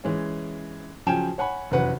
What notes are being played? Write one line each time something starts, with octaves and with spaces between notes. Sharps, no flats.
E3 G#3 C#4
C#3 F3 F#3 G5 G#5 E7
C#5 F#5 G#5 B5
F1 F#2 E3 F#3 B4 F#5